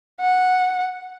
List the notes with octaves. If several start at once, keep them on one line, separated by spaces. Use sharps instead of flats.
F#5